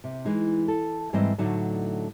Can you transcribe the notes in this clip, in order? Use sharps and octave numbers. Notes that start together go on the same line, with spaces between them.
C3
E3 G#3 D#4
A4
G#2 E3 G3 C4 E4 D#5
A2 D3 F#3 A3 D#4